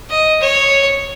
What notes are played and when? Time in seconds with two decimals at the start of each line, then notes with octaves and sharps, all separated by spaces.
0.10 D#5
0.40 C#5